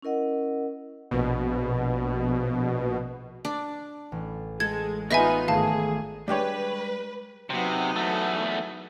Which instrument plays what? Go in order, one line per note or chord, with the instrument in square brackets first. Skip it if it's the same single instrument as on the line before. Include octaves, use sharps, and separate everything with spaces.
[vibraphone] C#4 E4 A#4 D#5 F#5
[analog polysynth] A#1 B2
[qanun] D4
[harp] A1
[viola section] G#3 [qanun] A4 [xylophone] G#6
[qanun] B3 C#6 [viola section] D#4 F4 [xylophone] D#5 E5 G#5
[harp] G#1 A3 [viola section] G#4 [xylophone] F5 A5
[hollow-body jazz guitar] G3 G#3 G5 [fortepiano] D4 G4 C#5 [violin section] B4
[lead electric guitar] C3 [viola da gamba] F#3 B3 D#4
[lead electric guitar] E2 A3